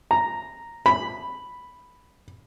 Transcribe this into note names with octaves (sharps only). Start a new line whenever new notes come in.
A#5
B5